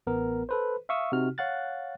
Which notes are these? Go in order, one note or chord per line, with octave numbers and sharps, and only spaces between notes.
A1 B3 A#4
A4 B4 C5
E5 F5 C#6 D#6 E6
C3 D#4 F#4 F6
C#5 F5 F#5 F#6 A6